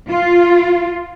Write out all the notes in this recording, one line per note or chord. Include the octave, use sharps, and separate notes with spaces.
F4